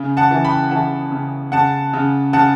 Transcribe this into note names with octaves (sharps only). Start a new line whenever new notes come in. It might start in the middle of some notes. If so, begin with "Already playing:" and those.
Already playing: C#3
F#5 A5
E3
G5 B5
E3 F#5 A5
C#3
C#3 F#5 A5
C#3
C#3 F#5 A5